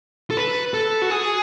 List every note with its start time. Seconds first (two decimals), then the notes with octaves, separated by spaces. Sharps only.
0.31 A4
0.37 B4
0.74 A4
1.02 F#4
1.10 G#4